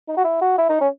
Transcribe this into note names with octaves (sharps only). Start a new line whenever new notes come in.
D#4
F#4
E4
F#4
E4
D#4
C#4